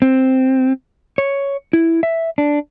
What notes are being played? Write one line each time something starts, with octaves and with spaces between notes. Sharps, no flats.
C4
C#5
E4
E5
D4